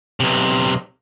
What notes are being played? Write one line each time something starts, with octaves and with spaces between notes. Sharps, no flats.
B1 C3